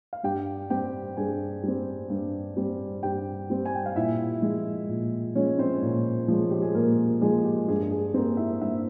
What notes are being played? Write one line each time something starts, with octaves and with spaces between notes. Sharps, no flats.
F5
G2 G4 G5
G3 C4 G4 G5
G2 G#4 G#5
G3 C4
G2
G3 C4
G2 G4 G5
G3 C4
G#5
G5
F5
A#2 E4 E5
F3 G#3
A#2
F3 G#3 C#4 C#5
C4 C5
A#2
F3 G#3
G4
G#4
A#2 A#3 A#4
F3 G#3 G#4
G4
G2 G#4
G#4
G3 A#3 C4 C5
E4 E5
G2 E4 E5